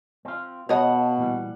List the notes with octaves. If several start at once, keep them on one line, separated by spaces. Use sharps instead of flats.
C4 F4
B2 C#5 D#5 F5 F#5 A5 B5
A#2 E3 G3